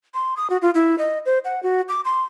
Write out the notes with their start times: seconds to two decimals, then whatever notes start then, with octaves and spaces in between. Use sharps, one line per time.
0.14 C6
0.37 D#6
0.50 F#4
0.62 F4
0.75 E4
0.98 D#5
1.26 C5
1.45 F#5
1.63 F#4
1.89 D6
2.05 C6